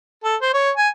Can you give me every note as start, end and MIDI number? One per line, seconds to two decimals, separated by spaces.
0.24 0.36 69
0.42 0.53 72
0.54 0.70 73
0.77 0.88 80